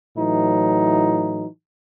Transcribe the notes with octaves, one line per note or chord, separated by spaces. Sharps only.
A2 E3 F#3 D#4